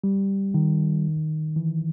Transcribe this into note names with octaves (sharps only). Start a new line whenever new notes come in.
G3
D#3
E3